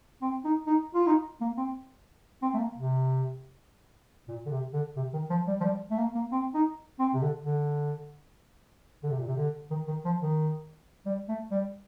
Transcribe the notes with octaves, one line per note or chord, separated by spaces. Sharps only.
C4
D#4
D#4
F4
D#4
A#3
C4
C4
A3
A#3
C3
A#2
D3
C3
D3
C3
D#3
F3
G3
F3
G3
A3
A#3
A#3
C4
D#4
C4
C3
D3
D3
D3
C3
A#2
C3
D3
D#3
D#3
F3
D#3
G3
A3
G3